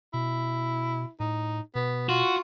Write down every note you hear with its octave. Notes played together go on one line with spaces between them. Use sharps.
B2 E4
A2 D#4
B2 B3
F4 F#4